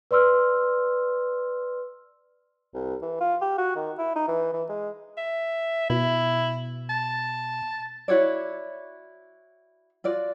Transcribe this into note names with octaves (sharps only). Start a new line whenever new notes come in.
B4 D5 C6 E6 F6
C2
E3
F4
G4
F#4
D#3
E4
D#4
E3
E3
G#3
E5
B2 E4
A5
E4 F#4 C#5 D5
F4 F#4 D5